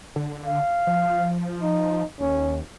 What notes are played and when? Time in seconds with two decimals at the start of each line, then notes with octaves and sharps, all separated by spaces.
0.16 D3
0.46 F5
0.87 F3
1.62 D#4
2.20 D#2 C#4